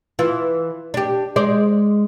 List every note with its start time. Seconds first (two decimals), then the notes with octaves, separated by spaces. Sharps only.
0.19 E3 F4
0.94 D4 G4
1.36 G#3 C5 D5